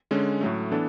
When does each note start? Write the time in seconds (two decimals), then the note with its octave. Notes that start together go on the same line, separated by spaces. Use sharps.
0.11 D3 G#3 C#4
0.41 A2 F#3 A3
0.72 E3 B3 D4 A4